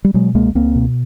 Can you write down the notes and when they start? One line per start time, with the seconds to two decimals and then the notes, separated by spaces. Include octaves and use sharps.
0.04 G3
0.14 B2 F#3 G#3
0.34 C#2 G#3 A#3
0.55 C#2 A#3 C4
0.75 B2